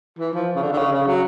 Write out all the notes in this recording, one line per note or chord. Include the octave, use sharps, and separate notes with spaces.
E3
F3
C#3
D3
D3
C#3
C#3
F#3